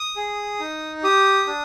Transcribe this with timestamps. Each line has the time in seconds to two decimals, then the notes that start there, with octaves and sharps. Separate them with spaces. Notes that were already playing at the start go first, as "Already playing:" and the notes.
Already playing: D#6
0.16 G#4
0.60 D#4
1.04 G4 D#6
1.47 D4